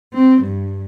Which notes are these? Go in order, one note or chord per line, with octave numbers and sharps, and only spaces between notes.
C4
G2